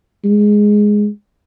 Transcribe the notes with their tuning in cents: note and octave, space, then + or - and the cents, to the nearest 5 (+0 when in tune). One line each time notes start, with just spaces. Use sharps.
G#3 +0